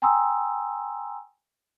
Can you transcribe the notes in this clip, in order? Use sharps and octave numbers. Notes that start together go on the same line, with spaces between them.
G5 G#5 A#5 C6 D#6 E6